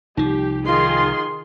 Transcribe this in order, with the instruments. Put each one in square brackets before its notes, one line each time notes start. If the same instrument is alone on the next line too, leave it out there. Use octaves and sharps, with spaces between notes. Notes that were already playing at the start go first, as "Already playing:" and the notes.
[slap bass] C2 F3 [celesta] D#4 [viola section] G4
[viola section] D#3 G#4 C6 [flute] F4